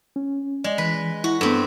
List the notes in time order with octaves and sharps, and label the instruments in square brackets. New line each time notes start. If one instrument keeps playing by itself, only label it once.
[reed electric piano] C#4
[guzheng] G#3 [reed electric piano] D5 D#5
[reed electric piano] E3 [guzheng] B4
[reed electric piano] E4 [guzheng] F#4
[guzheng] G2 C4 [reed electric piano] B3 A4